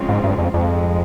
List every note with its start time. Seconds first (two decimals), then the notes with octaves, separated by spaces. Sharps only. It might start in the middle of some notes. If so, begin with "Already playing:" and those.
Already playing: C#3 F3 G#3 C4 F4
0.09 G#2
0.24 G2
0.38 F2
0.53 F2 G#2 F3 G#3